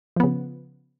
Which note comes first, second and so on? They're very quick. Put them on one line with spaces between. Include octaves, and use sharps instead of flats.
F3 B3 C#3